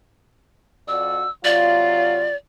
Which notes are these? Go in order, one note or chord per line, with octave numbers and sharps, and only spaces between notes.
F2 F#4 D5 E6
C3 F#3 F4 D5